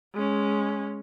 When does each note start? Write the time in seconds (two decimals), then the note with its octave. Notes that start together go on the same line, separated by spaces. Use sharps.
0.14 G#3 C#4